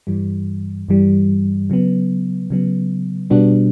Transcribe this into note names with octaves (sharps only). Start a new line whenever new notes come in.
G2 E3 G3
G2 E3 G3
C#3 F#3 B3
C#3 F#3 B3
B2 G3 B3 D4 F#4